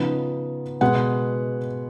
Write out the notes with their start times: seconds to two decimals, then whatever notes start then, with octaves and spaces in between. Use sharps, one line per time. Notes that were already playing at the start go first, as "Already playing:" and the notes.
Already playing: C#3 F3 B3 D#4
0.81 B2 G#3 B3 F#5